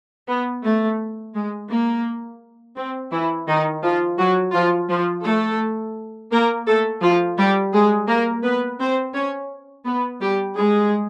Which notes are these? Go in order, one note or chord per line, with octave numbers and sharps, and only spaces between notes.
B3
A3
G#3
A#3
C4
E3 E4
D#3 D#4
F3 F4
F#3 F#4
F3 F4
F3 F4
A3 A4
A#3 A#4
A3 A4
F3 F4
G3 G4
G#3 G#4
A#3 A#4
B3 B4
C4 C5
C#4 C#5
B3 B4
G3 G4
G#3 G#4